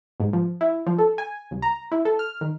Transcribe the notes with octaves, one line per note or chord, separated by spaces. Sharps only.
G#2
F3
E4
F3
A4
G#5
C2
A#5
E4
A4
F6
D#3